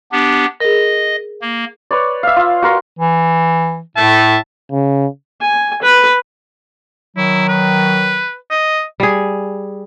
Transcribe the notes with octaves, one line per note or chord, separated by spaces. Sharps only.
B3 D4 G4
G#4 A#4 D#5
A#3
B4 C#5 D5
E5 F5
F4
F#4 A#4 C6
E3
A2 E5 A5
C#3
G#5
B4
D#3 F#3 E4
B4
D#5
G3 G#4